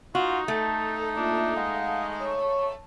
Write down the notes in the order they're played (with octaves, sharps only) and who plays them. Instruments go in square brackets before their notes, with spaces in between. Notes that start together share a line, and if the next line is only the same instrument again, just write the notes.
[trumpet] D#4 [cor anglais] F4 [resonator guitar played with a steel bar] F#4
[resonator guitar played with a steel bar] A3 [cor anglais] A4
[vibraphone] A#3 F4 E5 [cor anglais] D4
[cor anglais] G#3 [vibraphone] F5 F#5
[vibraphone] C#5 C#6